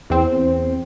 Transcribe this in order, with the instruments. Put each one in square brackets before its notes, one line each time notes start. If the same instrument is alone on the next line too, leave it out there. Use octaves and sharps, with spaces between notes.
[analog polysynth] E2 C4